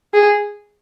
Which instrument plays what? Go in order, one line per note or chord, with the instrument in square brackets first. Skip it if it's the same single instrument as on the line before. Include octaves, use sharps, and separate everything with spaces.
[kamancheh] G#4